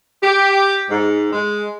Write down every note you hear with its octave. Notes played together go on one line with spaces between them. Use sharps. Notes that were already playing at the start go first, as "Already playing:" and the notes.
G4
G#2
G#3